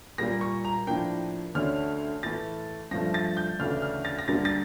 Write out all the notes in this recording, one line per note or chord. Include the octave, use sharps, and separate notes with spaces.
A#2 G3 A#3 A#6
C#6
A#5
A2 F3 A#3 D4 G5
D2 D3 A3 C#4 F6
A2 E3 A3 A6
G2 F3 A3 A#6
A6
G6
D2 C#3 E3 A3 D4 F6
F6
A6
A#6
D2 D3 G3 A#3 A6
A6